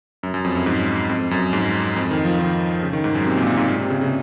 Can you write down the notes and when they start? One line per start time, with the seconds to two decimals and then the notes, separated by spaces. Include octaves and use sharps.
0.23 F#2
0.34 F#2
0.44 F2
0.55 F#2
0.66 G#2
1.09 F2
1.31 F#2
1.53 G#2
1.96 F2
2.11 D#3
2.25 F3
2.40 D#3
2.83 C#3
2.93 D#3
3.04 G#2
3.15 F#2
3.25 C3
3.36 A#2
3.47 A#2
3.57 G#2
3.68 A#2
3.80 C3
3.90 C#3
4.01 C#3